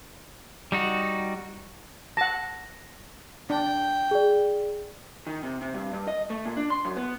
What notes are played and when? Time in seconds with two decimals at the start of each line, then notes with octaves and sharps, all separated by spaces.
0.72 G3 D#4 F#4
2.17 F#5 A5 A#6
3.50 D4 G5
4.11 G#4 D5
5.27 D#3
5.43 C3
5.62 C3
5.74 G2
5.93 G2
6.08 D#5
6.30 A3
6.45 A#2
6.57 D4
6.70 C6
6.85 F#2
6.96 B3